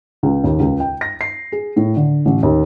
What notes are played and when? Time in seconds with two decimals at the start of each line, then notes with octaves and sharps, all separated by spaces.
0.23 C#2
0.44 D#2
0.60 C#2
0.80 G5
1.01 A#6
1.21 C7
1.52 G#4
1.76 A2
1.96 D3
2.25 A1
2.43 D#2